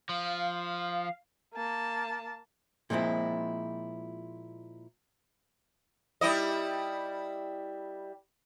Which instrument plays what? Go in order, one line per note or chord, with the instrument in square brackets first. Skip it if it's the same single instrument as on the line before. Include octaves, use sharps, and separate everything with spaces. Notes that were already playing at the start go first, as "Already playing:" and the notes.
[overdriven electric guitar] F3 [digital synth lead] F5
[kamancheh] A#3 A5
[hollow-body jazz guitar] A#2 F3 G#3 C4 E4
[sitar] G3 E4 D#5